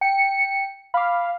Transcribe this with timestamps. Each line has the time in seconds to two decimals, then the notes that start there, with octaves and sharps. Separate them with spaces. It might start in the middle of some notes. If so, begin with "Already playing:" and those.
0.01 G5 C#7
0.94 F5 B5 D6